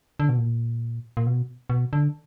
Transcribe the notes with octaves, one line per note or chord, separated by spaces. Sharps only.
D3
B2
A#2
A#2
B2
B2
D3